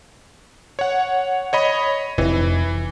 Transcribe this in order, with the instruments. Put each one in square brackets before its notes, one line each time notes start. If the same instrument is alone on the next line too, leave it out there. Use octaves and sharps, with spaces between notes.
[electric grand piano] C#5 F#5
C#5 D#5 B5
[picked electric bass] F1 [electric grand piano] E3